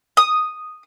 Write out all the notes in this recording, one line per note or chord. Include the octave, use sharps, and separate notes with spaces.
D#6